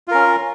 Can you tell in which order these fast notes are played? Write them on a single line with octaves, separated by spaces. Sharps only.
F4 A#4 C#4